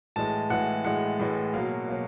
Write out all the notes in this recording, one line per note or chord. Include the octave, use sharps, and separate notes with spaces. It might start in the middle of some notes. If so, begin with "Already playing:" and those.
A2 E3 G#3 A5
A2 E3 G#3 F#5
A2 E3 G#3 F#5
A2 E3 G#3
B2 F#3 A#3 F5
B2 F#3 A#3